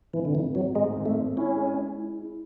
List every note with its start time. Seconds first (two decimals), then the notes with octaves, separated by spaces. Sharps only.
0.13 G#1 E3
0.25 D3
0.35 G#1 E3
0.55 G#1 F#3
0.75 G#2 G#3
0.95 G#1
1.06 A3
1.16 G#1
1.37 C#4 E4
1.57 G#3
1.78 G#3
1.98 E4
2.18 E4